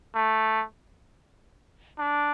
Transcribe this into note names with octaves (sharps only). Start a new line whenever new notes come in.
A3
D4